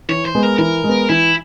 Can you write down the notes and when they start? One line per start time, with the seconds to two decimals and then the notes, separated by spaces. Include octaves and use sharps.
0.09 E3 C#5
0.25 C5
0.35 G#3 B3
0.43 A#4
0.58 E3 A#4
0.84 G#3
0.89 B3
1.09 E3 E4